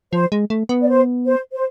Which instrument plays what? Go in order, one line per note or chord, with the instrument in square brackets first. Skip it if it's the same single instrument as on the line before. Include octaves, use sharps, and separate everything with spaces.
[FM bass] F3 [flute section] C5
[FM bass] G#3
A3
B3
[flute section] D5
C5
C5
C5